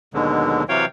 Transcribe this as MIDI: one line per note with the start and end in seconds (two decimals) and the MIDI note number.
0.14 0.63 39
0.14 0.63 47
0.14 0.63 50
0.14 0.63 54
0.14 0.63 56
0.69 0.85 48
0.69 0.85 52
0.69 0.85 54
0.69 0.85 73
0.69 0.85 77
0.69 0.85 79